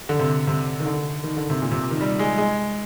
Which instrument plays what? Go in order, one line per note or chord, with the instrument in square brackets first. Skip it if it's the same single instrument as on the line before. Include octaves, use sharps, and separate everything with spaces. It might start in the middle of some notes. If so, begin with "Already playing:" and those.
[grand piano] D3
C3
C3
D#3
D3
D#3
D3
C3
A#2
C3
D#3
G3
G#3
G#3